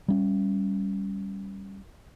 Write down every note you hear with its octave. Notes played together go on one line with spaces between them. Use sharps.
G3 C#4